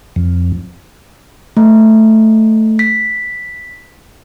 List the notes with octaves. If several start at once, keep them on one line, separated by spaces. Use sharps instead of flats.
F2
A3
B6